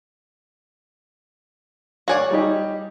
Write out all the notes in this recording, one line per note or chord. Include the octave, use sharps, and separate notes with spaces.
F#4 C#5 D5 F5 G#5
G3 D#4 G4